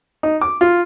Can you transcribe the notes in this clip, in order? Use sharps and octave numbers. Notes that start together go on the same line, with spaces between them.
D#4
D6
F4